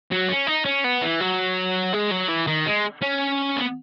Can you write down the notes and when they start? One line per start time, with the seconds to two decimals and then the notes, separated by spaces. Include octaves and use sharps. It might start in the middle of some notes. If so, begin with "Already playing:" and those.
0.11 F#3
0.29 C#4
0.47 D#4
0.65 C#4
0.84 B3
1.02 E3
1.21 F#3
1.93 G#3
2.11 F#3
2.29 E3
2.47 D#3
2.66 G#3
3.02 C#4
3.57 B3